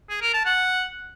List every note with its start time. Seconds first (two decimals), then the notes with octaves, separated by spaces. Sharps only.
0.10 G#4
0.22 A#4
0.34 A5
0.45 F#5